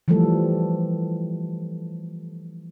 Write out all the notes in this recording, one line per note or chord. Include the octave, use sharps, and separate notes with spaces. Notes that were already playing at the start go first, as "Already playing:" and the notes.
E3 F3 G3 A3 A4